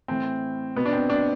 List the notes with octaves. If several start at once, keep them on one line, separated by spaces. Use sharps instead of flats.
A2 E3 C4
B2 B3
D4
C4
D4